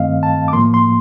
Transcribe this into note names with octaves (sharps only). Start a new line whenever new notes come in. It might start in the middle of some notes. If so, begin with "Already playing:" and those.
Already playing: G2 D#3 A3 C4 D#5 F5
A5
D6
A2 F3 A#3 C6
C6